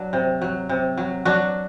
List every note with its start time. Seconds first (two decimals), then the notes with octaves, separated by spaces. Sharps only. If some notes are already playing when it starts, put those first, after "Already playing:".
Already playing: F#3 D4
0.13 C3
0.42 F#3
0.69 C3
0.97 F#3
1.25 F#3 D4 F#4